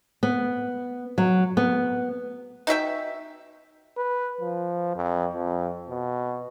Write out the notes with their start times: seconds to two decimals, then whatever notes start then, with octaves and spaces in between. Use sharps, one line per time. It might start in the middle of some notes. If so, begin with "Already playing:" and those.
0.23 B3
1.18 F#3
1.57 B3
2.67 D#4 F#4 E5 G5
3.97 B4
4.41 F3
4.96 F2
5.33 F2
5.90 B2